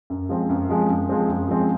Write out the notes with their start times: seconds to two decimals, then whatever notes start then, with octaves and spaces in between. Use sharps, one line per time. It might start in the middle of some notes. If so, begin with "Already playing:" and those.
0.10 F#2
0.29 F3 G#3 C4
0.49 F#2
0.69 F3 G#3 C4
0.89 F#2
1.09 F3 G#3 C4
1.28 F#2
1.49 F3 G#3 C4